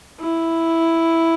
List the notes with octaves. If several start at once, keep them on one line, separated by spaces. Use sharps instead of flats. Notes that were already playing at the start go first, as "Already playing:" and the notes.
E4